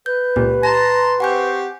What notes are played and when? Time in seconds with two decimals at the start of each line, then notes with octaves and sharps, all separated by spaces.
0.06 B4 G6
0.36 C#2 A#2 G4
0.63 A5 A#5 C6 A#6
1.20 C4 G4 F#5 G#5 C#6 G6